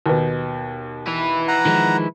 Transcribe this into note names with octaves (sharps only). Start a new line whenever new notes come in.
D#2 B2
E4 B4
F#5 A#5
D#3 F3 G#3